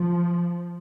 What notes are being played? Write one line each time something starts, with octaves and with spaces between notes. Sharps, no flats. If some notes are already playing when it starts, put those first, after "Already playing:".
Already playing: F3